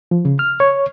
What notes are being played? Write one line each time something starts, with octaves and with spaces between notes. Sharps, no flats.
F3
C#3
F6
C#5